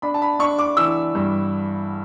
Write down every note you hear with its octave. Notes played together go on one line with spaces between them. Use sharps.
D4 B5
A5
B5
D4 C#6
D6
E3 E6
G2